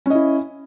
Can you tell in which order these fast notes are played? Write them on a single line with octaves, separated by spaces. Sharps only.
C#4 D#5 E4